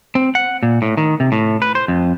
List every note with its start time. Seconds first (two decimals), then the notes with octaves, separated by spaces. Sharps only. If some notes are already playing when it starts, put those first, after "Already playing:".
0.15 C4
0.35 F#5
0.63 A#2
0.82 A2
0.97 D#3
1.20 C3
1.32 A2
1.62 B4
1.75 C5
1.88 F2